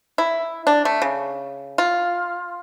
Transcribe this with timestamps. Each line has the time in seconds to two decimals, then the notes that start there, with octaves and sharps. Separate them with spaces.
0.18 E4
0.67 D4
0.85 A3
1.02 C#3
1.78 F4